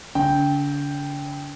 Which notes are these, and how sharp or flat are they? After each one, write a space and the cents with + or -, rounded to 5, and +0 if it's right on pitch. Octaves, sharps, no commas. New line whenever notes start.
D3 -40 G5 +0